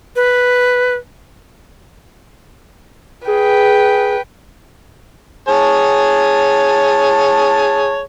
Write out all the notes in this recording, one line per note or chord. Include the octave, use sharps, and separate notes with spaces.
B4
G#4 B4 G5
G#4 C#5 A5